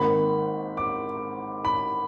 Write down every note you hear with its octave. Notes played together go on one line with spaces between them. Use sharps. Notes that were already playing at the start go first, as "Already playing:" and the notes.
Already playing: G#1 G#2 D#3 A#3 B5
D6
B5